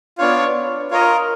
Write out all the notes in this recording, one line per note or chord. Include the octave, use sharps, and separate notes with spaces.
B3 D4 F4 C#5
F4 A#4 C#5 D#5